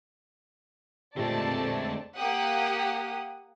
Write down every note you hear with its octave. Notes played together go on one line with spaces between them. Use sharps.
A#2 D3 G#3 A3 C4 G4 D5 A5
A#3 G4 F#5 D#6